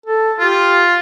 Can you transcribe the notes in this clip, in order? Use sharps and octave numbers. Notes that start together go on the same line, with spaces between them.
A4
F4 G4